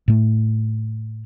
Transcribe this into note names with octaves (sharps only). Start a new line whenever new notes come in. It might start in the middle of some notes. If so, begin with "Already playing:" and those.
A2 A3